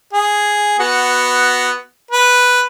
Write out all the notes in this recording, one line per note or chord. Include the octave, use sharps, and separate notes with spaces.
G#4
B3 F#4
B4